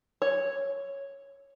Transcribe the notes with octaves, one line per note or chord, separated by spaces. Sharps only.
C#5